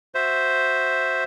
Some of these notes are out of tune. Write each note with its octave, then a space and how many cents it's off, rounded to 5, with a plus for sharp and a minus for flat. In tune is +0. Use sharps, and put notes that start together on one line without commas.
F#4 +0 C5 +0 E5 +0